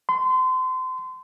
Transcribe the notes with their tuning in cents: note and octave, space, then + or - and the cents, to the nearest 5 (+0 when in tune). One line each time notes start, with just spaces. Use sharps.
C6 -30